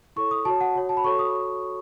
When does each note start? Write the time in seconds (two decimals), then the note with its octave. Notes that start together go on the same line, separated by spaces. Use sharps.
0.16 E4 A4 C#5 C#6
0.31 D#6
0.45 F#4 C#5 A5
0.61 F#5
0.75 F#4 C#5
0.89 A5
0.97 B5
1.04 F#4 A4 C#5 C#6
1.19 D#6